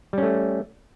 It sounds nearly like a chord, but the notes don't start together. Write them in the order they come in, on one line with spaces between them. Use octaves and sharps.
G3 C#4 A3